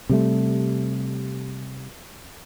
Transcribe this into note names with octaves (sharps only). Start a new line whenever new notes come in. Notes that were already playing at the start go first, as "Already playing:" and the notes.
C3 G3 A3